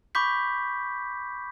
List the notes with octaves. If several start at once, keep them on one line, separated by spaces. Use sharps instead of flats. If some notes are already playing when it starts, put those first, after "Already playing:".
B5 C#6 D6 G6 B6